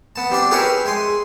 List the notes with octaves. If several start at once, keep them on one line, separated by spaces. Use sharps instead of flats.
B3 A5
G3 C4 D4 D5
G4 G#4 A#4 B4 C#5 E5
G#3 G#5 C6